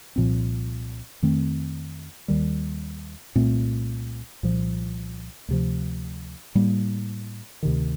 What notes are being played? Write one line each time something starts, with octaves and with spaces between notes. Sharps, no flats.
C2 A#2 F3 C4
F2 D#3 A3 C4
D#2 D#3 G3
C2 A#2 A3 C4
C2 A#2 F3
D2 C3 F3
A2 G3 A#3
D2 C3 D#3